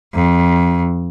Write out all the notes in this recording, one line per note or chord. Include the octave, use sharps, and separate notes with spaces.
F2